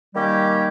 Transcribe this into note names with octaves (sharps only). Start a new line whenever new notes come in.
D#3 G3 A#3 C#4 G4